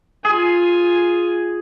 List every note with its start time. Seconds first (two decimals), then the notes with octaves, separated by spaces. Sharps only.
0.25 F4 G#4 G#5